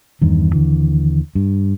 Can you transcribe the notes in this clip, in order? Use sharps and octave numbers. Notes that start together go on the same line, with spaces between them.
E2 G2 D#3
D#2 D3 E3
G2